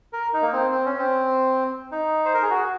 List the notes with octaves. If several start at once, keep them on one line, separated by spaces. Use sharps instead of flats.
A#4
D#4
A#3
C4
C4
C#4
C4
D#4
C5
A#4
G#4
F#4